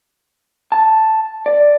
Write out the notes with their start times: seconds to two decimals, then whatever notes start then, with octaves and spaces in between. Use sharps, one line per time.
0.72 A5
1.46 D5